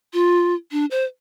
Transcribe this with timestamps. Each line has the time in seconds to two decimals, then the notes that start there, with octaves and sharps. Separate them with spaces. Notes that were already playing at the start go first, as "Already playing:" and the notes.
0.13 F4
0.72 D4
0.91 C5